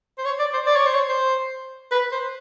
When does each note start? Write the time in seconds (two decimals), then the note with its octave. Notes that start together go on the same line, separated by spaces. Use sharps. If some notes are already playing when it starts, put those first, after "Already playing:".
0.18 C5
0.25 C#5
0.39 D5
0.54 C5
0.66 D5
0.76 C#5
0.86 C5
0.94 C#5
1.09 C5
1.91 B4
2.12 C5